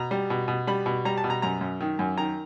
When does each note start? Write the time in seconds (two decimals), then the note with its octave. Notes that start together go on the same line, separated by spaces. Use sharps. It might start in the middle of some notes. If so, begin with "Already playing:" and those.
Already playing: B2 A#5
0.11 G3
0.30 B2
0.48 B2
0.67 G3 B5
0.86 B2
1.05 G3 A#5
1.17 A5
1.24 B2
1.30 A#5
1.42 F#2 A#5
1.61 F#2
1.81 D#3
1.99 F#2
2.17 D#3 A#5